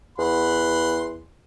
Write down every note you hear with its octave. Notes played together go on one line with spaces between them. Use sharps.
E2 F#5 B5 C6